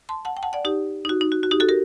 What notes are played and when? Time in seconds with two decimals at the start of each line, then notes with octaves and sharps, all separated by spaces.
0.09 A5 C6
0.25 F#5 A5
0.37 G5
0.43 F#5 A5
0.53 D5 F#5
0.65 D#4 G4
1.05 D#4
1.09 F#4
1.21 D#4
1.32 F#4
1.43 F#4
1.51 D#4 G4
1.60 F#4 A4
1.69 G4 A#4